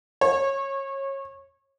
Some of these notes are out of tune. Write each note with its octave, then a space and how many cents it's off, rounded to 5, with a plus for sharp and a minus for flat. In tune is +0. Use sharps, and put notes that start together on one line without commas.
C#5 -25